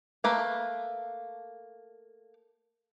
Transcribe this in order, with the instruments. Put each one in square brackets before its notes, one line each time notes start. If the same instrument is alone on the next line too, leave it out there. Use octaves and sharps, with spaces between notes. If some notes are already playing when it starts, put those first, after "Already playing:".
[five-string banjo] A3 A#3 B4